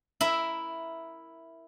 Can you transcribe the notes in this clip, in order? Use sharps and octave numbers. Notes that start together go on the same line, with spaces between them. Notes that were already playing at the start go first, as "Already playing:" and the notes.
E4 A#4 E5